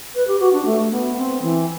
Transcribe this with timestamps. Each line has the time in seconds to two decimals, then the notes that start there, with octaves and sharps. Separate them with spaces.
0.15 B4
0.27 G4
0.39 F#4
0.53 D4
0.65 A3
0.91 B3
1.16 C4
1.42 E3